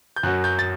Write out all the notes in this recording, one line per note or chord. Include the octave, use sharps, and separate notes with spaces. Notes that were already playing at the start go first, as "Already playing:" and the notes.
G6
F#2 F#3 F#6
G6
A6